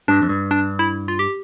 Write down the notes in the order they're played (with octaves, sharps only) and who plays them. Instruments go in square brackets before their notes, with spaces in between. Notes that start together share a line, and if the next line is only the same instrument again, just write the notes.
[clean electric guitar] G2 [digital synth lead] D4
[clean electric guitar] F2
G2
[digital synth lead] D4
E4
F4
G4